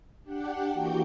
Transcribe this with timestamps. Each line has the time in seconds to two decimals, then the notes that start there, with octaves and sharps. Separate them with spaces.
0.23 D4 G4 F#5
0.69 E3 A#3 F#4 G5 G6